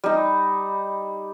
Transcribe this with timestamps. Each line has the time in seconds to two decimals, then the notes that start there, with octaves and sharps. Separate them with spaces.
0.04 G3 D#4